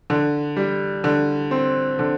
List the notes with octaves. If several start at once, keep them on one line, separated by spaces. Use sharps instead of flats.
D3
G3
D3
C4
D3